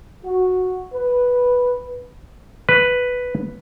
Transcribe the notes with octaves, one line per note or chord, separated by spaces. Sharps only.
F#4
B4
B4